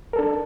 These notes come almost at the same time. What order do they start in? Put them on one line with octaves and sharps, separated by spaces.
A#4 A4 D4